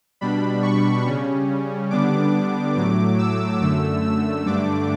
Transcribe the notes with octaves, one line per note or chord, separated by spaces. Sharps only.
B2 G3 D4 B5
C#6
C#3 G3 C#4
D3 G3 B3 D4 D6
A2 F#3 A3 D6
E6
F#2 D3 A3 E6
E6
G2 D3 A3 D4 D6